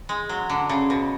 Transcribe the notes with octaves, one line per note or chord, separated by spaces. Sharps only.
G#3
F#3
D3
C#3
B2